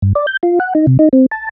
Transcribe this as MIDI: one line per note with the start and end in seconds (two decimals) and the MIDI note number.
0.02 0.13 43
0.15 0.26 74
0.27 0.37 91
0.43 0.59 65
0.60 0.73 78
0.75 0.86 63
0.87 0.97 48
0.99 1.09 63
1.13 1.26 60
1.31 1.49 81